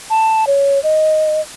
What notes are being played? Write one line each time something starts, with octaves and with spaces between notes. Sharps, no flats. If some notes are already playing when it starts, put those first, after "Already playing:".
A5
C#5
D#5